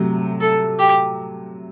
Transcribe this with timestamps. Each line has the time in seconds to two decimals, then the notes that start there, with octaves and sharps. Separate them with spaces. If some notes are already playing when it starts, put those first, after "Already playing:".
Already playing: C3 F#3 A3
0.41 A4
0.79 G4